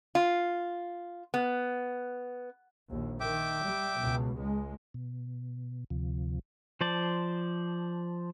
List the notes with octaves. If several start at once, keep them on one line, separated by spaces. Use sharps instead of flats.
F4
B3
A#1 D#2
D#3 E5 G5 D6
G3
C#2 B2
C#2 G#3
B2
D2 C3 F3
F3 C5 D5 A5